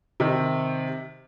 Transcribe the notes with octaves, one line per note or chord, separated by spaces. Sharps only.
C3 D#3